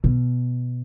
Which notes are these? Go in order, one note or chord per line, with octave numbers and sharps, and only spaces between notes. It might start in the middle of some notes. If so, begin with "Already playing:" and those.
B2